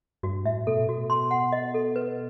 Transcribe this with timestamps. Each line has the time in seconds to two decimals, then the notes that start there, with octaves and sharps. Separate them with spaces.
0.23 G2 F#4
0.45 A2 E5
0.66 B2 A4
0.89 F#4
1.10 C6
1.31 F#5
1.53 D#5
1.74 A4
1.96 B4